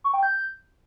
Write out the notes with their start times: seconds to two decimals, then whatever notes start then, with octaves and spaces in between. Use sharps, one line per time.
0.04 C#6
0.14 G5
0.23 G6